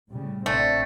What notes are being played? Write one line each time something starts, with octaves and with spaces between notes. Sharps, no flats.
A2 C#3 G3
A1 C3 A3 C4 D4